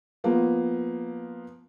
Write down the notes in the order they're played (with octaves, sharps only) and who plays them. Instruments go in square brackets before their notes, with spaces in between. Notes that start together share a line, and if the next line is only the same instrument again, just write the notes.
[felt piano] F3 A#3 B3